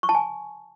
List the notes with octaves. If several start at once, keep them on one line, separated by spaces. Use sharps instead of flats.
C#6
A5
G#5